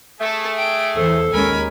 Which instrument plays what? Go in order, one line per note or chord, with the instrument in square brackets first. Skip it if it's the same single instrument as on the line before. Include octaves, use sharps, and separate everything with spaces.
[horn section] A3 G#4 [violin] A4 E5
[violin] G5 D7
[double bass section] E2 [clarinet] A4 [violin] C5
[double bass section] D#2 G#3 C#4 [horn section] A#4 [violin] G#5 B5